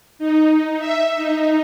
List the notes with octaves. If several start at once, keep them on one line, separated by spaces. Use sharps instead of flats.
D#4
E5
D#4